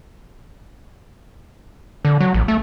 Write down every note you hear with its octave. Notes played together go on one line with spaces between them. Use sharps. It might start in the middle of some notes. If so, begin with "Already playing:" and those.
D3
F#3
A1
A3